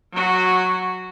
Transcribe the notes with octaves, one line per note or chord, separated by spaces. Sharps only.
F#3 F#4